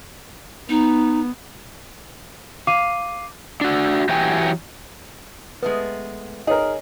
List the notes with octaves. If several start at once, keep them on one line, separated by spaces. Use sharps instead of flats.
B3 D#4
F5 D6 D#7
D4 F#4
E3 F#3 G4 C#5 G5 G#5
G#3 A3 B3 B4
D#4 G#4 A#4 C#5 D#5